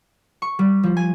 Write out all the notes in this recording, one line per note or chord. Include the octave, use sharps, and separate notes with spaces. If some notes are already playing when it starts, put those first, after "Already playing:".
C#6
G3
F3
G#5